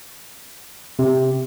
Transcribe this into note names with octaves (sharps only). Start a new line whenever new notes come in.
C3